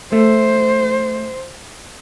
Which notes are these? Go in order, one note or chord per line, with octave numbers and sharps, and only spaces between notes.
A3 C5